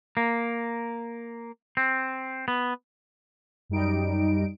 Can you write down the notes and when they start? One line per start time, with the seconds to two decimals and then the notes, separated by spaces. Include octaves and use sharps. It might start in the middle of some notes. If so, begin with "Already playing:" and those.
0.17 A#3
1.77 C4
2.48 B3
3.69 F#2 G3 D#4 D7